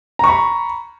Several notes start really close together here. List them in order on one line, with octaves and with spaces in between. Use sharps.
A#5 C#6 B5